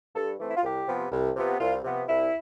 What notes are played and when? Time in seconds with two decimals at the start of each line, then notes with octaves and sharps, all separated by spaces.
0.15 G2 A4
0.40 E3 A3 C4
0.49 E4
0.57 F4
0.63 C2 G4
0.87 C3 F3 B3
1.12 C2
1.36 C3 F3 B3
1.60 C2 F4
1.84 C3 F3 B3
2.08 C2 E4